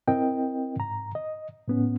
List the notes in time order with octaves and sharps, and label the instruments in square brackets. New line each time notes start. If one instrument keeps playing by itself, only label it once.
[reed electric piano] C4 E4 A#4 D#5 G5
G#2 A#5
D#5
A2 B3 C#4